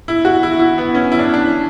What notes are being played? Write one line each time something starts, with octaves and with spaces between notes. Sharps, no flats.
E4
F#4
E4
E4
B3
C#4
E4
D4
C#4
D4